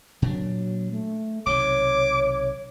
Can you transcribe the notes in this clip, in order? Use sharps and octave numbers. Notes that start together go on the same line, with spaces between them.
A#2 F#3 D4
A3
B1 C3 D#3 C#5 D6